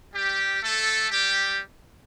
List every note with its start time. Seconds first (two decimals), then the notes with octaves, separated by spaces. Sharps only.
0.14 G3 G4
0.62 A3 A4
1.10 G3 G4